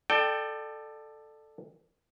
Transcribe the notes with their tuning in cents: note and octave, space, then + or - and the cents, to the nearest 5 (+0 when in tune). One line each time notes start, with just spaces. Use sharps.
A4 +0 D5 +30 G5 +0